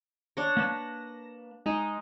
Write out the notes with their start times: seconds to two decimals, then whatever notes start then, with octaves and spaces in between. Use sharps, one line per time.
0.37 D4 C#5 A#6
0.57 A#3 B4 A5
1.66 G#3 D#4